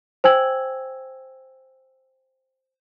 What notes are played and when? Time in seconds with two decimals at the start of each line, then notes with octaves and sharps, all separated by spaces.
0.24 C5 G5 G#5 E6 G#6 F#7